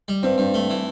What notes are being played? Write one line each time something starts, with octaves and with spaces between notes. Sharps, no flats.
G3
G2 C4
G2
A3
E3